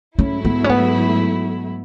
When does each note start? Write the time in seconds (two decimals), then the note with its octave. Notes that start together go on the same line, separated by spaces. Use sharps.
0.19 G#2 F#3 A3 C#4 E4
0.45 B3
0.64 C#4
0.69 B3